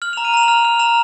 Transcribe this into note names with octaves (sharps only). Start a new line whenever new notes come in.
F6 F#7
A#5 F7
D#7
A#5 F7
F#7
F6 F7
F6 F7
A#5 F7